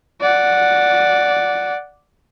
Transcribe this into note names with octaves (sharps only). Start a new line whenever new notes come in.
D5 F#5